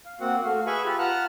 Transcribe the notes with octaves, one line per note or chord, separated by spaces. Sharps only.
F5
A#3 C4 F#4 F#5
A3 F#4 F5
G#4 B4 E5 G#5 B5 C#6
F4 G4 B4
F4 F#5 A5 A#5 F6 F#6